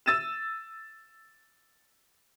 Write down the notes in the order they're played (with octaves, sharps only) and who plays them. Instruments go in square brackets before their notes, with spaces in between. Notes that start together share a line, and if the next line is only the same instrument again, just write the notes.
[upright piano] E6 A6 D#7 E7